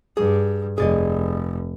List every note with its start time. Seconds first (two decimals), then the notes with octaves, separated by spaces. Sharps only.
0.17 G2 G#4
0.78 F1 G#4 D5 D#5